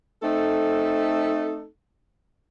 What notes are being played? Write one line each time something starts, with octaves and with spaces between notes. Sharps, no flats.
A3 C4 D#4 A4